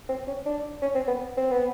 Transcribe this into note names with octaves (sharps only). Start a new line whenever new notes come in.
C4
C#4
D4
C#4
C4
B3
C4
B3